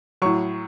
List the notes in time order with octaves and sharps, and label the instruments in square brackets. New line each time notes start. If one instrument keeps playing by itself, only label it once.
[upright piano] A2 F#3 C#6